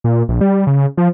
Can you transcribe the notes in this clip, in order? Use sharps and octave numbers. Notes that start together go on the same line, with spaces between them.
A#2
A#1
G3
C#3
F3